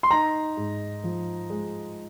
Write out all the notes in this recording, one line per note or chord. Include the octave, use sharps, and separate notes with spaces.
C6
D#4 A#5
G#2
F3
G#3